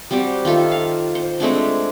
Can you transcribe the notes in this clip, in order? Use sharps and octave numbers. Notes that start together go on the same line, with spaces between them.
G3 C4 F#4 G4
D#3 F4 A4 E5
F5
C5
G#3 A3 C4 D4